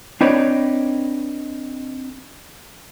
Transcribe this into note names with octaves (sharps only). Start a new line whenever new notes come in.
C4 D4 D#4 B4 C#5 D5